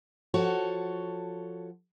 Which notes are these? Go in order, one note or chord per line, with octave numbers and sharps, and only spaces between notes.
F3 F#4 A4 C#5